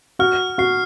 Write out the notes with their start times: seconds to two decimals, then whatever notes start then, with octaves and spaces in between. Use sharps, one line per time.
0.19 F#4 F6
0.58 F#4 C7